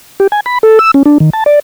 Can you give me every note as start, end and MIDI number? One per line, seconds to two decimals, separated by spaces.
0.20 0.27 67
0.32 0.40 80
0.46 0.58 83
0.63 0.79 69
0.79 0.91 88
0.94 1.03 61
1.06 1.18 62
1.20 1.30 51
1.33 1.44 81
1.46 1.59 74